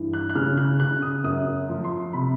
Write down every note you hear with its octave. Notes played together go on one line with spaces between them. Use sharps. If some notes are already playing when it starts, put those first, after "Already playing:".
Already playing: G2 E3
F#6
F#6
C#3 F6
F#6
C#3 F#6
D#6
F#2 D#6
F3
C6
C3 B5